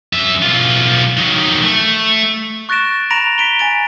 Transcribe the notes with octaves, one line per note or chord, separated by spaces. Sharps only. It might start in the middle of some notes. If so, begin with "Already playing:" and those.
F#2 E5
B1 F4
D#3 F#3
A3
C#6 F#6 A6 A#6 D7 E7
A#5 B5 A#6 D7 E7 F7
B6 D7 G7
G#5 A6 D7